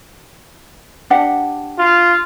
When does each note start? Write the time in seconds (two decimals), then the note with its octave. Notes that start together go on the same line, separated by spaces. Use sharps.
1.10 D4 G4 F#5
1.79 F4